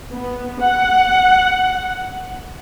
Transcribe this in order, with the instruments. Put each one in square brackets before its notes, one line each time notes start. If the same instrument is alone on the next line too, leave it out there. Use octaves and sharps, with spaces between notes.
[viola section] B3
F#5